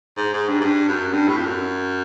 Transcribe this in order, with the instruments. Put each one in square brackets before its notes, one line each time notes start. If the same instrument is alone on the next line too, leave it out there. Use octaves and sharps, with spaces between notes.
[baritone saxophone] G#2
G#2
G2
G#2
G2
F#2
G2
A2
F2
F#2